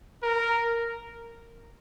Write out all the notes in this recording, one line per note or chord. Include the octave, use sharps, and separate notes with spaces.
A#4